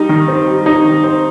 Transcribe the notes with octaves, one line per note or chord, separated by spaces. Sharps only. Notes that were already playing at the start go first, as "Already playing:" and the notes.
Already playing: G3 D#4
D#3
C4
G3
D#4
D#3
C4